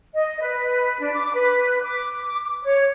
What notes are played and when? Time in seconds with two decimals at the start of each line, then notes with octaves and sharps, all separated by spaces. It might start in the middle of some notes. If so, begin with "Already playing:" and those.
0.14 D#5
0.41 B4
1.00 D4
1.13 D6
1.33 B4
1.82 D6
2.63 C#5